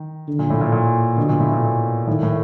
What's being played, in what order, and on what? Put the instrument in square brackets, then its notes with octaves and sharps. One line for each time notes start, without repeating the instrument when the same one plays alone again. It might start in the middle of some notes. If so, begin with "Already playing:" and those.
Already playing: [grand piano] D#3
[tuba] D3
[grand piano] A#2
A2
A#2
A#2
[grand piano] B2 [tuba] D3
[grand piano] A#2
A2
A#2
[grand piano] A2 [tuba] D#3
[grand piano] A2